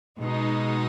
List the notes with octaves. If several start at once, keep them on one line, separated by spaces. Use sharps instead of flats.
B2 G#3 D#4